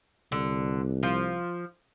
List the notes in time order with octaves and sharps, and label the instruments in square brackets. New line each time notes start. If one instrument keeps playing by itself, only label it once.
[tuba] C2 [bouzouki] D3
[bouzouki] F3